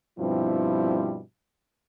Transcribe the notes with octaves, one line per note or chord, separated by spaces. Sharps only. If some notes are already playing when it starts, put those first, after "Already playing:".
G2 B2 F3 G3 C4 E4